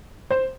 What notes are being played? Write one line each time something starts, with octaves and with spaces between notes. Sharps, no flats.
C5